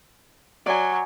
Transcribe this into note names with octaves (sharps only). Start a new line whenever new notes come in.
F#3 D5 G#5